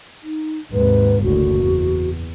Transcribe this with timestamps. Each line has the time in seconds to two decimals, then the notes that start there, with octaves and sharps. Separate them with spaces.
0.23 D#4
0.73 D#2 G#2 C3 B4
1.23 F#1 D2 A2 F#4
1.60 E2